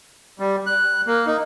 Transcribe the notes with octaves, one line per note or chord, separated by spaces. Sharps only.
G3
F#6
A#3
D#4